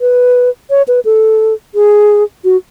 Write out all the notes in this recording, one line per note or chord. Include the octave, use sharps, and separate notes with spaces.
B4
C#5
B4
A4
G#4
F#4